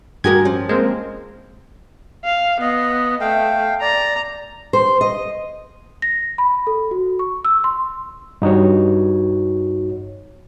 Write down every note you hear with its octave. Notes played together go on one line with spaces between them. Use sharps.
G2 G#3 F#4 G4 A#4 D#5 G#6
F3 C#4
G#3 A#3 C4 A#4 C5
F5
B3 D#5
A3 F5 G5
D5 A#5
C5
D#5
A#6
B5
A4
F#4
C#6
E6
C6
G2 D#4 F#4 C#5